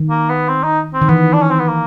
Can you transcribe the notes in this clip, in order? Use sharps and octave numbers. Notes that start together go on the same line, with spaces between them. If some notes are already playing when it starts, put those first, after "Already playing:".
Already playing: D#3
A#3
B3
C4
D#4
C4
D#3
E3 B3
D4
C#4
C4
B3
A#3